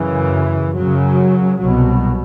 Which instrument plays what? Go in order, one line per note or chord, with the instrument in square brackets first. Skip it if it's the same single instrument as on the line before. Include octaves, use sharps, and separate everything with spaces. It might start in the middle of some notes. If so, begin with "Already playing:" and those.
Already playing: [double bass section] F#2 C#3 E3
F#2 C#3 F#3
C2 B2 F#3